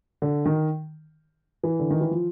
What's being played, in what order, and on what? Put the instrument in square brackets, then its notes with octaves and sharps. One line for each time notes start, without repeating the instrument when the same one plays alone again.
[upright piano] D3
D#3
E3
D3
D#3
E3
F3